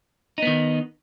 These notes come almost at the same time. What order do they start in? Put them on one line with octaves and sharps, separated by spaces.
D#4 B3 D#3